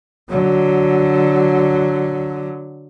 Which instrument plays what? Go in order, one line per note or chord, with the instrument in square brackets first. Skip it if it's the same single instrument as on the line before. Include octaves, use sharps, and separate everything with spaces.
[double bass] D3 F#3